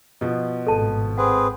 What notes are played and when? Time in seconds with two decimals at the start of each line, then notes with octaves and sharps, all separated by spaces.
0.21 B2 F3
0.67 G#1 A2 A4 A5
1.18 C4 G#4 B4 F#5